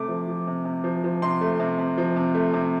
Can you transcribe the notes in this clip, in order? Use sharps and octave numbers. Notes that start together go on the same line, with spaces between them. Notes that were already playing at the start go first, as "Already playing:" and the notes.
Already playing: C3 A3 D6
F3
F3
C3
C3
F3
F3
C3 C6
A3
C3
C3
F3
C3
A3
C3